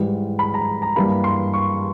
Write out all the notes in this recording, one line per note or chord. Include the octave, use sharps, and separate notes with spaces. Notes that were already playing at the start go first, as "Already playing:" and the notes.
Already playing: G#2 E3 G3
B5
A#5
A#5
G2 E3 G3 A#3 B5
C6
C#6